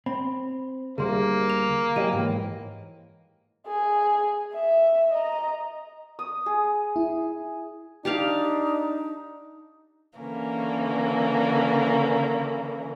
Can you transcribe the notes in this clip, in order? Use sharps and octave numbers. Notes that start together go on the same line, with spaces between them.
C4 B5
D2 G3 A#3 G#4 C6
F7
F#3 G4 G#4 C#5 D#5 D#7
G#2 E3 A#3 G5
G#4
E5
D#5 A#5
D#6
G#4
E4
D4 D#4 G4 D5 F5
D3 E3 A#3 C#4